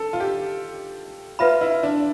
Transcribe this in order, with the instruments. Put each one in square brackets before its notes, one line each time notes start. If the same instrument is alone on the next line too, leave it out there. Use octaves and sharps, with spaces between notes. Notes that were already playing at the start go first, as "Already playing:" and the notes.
Already playing: [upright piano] A4
F4
G4
[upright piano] F4 [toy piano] B4 E5 B5
[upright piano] E4
D4